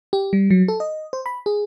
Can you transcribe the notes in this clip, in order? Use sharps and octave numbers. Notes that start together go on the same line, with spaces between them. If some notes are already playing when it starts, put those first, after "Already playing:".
G4
G3
F#3
A4
D#5
C5
B5
G#4